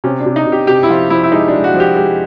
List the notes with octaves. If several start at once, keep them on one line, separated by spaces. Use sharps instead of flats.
C3 C#4
D4
C3
D#4
C3
G4
C3 G4
E4
F3 F4
F3 E4
E4
G#3 D#4
D4
G#3
F#4
F3
G4
G#3 G4